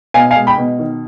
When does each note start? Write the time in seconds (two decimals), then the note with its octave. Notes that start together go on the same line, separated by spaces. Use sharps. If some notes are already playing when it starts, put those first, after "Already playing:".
0.14 B2 F5 G#5
0.31 F5 G#5
0.36 G#3
0.47 G5 B5
0.58 B2
0.79 D#3